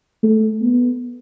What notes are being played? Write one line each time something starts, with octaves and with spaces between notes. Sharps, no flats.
A3
B3